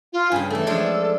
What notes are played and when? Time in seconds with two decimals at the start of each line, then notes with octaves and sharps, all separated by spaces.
0.13 F4
0.32 G2 C#3 G#5
0.50 E3 A3 A4
0.67 F3 G#3 D4